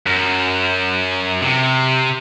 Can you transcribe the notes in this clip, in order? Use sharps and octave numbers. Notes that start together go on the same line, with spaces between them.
F#2
C3